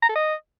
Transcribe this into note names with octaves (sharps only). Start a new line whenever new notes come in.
A#5
A4
D#5